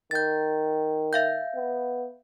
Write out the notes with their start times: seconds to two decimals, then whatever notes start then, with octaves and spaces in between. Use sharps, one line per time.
0.11 D#3 G6 A6
1.13 E5 F5 G6
1.55 B3